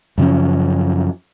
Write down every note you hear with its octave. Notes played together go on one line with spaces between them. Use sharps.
F#2 C#3 F3 C#4